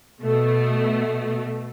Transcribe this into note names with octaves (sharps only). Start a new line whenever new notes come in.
B2 A3